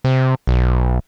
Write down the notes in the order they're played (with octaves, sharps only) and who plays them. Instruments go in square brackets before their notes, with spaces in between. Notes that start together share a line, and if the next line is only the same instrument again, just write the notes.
[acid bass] C3
B1